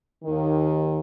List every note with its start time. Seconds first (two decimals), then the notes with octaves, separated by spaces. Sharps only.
0.24 D#2 D#3